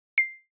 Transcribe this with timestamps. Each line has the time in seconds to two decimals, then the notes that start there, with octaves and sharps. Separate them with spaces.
0.18 C7